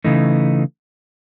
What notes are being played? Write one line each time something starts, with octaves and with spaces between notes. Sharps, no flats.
C#3 E3 A3 D#4